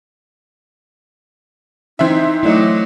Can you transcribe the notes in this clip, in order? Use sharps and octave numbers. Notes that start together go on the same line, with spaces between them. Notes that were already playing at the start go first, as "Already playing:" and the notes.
E3 C4 D#4 E5
F#3 A3 E4 D5 D#5